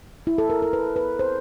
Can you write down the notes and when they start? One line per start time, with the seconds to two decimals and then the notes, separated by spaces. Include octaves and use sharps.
0.27 E4
0.38 A4
0.50 A#4
0.62 A#4
0.73 B4
0.96 B4
1.19 C5